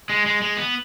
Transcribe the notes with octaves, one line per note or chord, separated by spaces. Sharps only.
G#3
G#3
G#3
B3